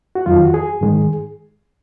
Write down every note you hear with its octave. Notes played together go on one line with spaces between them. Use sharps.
F#4
F2 D#3 F#3 F4
F#4
G#4
G#2 D#3 G#3